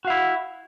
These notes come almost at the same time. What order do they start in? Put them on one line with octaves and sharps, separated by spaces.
F#4 F5 E4